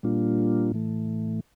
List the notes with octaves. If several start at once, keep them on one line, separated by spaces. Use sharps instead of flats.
A#2 G3 A#3 D4 F4
A2 E3 A3